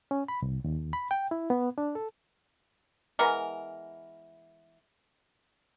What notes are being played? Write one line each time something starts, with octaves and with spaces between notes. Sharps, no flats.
C#4
B5
C2
D#2
B5
G5
E4
B3
D4
A4
E3 G#3 B3 A#4